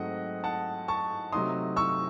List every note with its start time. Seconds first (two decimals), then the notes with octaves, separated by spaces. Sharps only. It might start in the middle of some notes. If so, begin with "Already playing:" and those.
Already playing: G#2 F#3 A3 C4 D#5 F#5
0.44 F#5 A5
0.88 A5 C#6
1.32 C3 F#3 A3 D#4 C6 D#6
1.76 C#6 E6